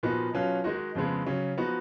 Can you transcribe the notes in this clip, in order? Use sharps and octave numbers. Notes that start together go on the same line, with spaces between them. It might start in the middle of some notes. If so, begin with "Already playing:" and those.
A#2 F3 B3 D#4 F#4
B2 F#3 C#4 F4
D#3 G#3 D#4 F#4
F2 C#3 F3 G#3 B3
C#3 F#3 C#4
F3 B3 D#4 F#4